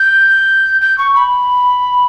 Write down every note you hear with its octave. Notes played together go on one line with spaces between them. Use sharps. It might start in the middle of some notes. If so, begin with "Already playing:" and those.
Already playing: G6
G6
C#6
B5